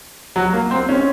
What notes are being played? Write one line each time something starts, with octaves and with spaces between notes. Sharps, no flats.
F#3
A#3
C4
C#4